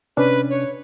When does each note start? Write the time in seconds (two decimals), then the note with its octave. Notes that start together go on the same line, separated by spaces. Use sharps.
0.17 C3 C#4 D4 B4
0.50 C#5